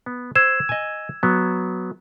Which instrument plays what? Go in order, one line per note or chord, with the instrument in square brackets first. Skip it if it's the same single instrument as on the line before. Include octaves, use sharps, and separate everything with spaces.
[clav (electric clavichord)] B3
[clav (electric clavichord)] C5 [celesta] E6 G#6 E7
[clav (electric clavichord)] D#5 G#5
F#3 B3